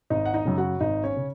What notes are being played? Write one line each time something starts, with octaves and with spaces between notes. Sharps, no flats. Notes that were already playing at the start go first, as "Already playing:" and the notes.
G#1 D#4 D#5
F#5
D#4 D#5
F#2 C#3
F#4 F#5
G#1 D#4 D#5
C#4 C#5
C#3